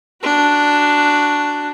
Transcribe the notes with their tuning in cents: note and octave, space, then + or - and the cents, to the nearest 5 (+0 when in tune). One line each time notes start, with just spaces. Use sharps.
D4 +0 F#4 +0